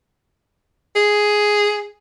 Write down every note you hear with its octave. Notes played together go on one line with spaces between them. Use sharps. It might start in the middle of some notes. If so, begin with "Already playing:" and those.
G#4